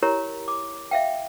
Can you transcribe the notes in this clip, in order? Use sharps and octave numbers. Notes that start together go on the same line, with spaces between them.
E4 G4 A#4 C#5 A#5
D6
E5 F5 G5